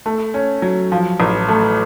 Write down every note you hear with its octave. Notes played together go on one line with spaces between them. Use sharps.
A3
C#4
F#3
F3
A1
A3